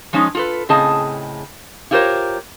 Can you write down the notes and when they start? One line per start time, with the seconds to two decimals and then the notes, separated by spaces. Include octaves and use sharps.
0.13 F3 G#3 C#4 D#4
0.35 F4 A4 B4
0.69 A2 C#3 C4 G#4 D#5 A5
1.91 E4 F4 G4 A#4 C5 C#5